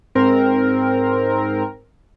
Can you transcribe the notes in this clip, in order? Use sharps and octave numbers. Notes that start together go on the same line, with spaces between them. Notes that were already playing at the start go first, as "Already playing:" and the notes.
G#2 C4 A#4